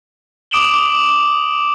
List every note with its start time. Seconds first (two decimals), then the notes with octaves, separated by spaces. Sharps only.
0.51 D6 D#6 D7 E7 F#7 G7